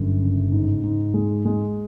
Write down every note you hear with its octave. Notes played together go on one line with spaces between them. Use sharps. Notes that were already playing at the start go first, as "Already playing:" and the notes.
Already playing: G1 F#2
C#3
G#2
G#2
G#3
G#3